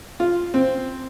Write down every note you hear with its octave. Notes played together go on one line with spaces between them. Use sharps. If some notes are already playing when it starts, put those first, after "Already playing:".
F4
C4